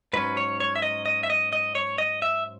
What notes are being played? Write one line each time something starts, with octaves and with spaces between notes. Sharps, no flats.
G#2 F#3 C#4 B4
C#5
C#5
E5
D#5
D#5
E5
D#5
D#5
C#5
D#5
E5